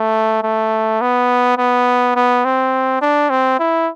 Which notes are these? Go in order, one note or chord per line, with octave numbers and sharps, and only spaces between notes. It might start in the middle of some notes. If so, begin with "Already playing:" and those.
Already playing: A3
A3
B3
B3
B3
C4
D4
C4
E4